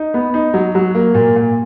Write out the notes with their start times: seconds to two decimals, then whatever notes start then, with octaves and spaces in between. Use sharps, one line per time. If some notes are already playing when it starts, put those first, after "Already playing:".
Already playing: D#4
0.14 B3
0.34 D#4
0.54 F#3
0.75 F#3
0.95 A#3
1.14 A#2
1.36 A#2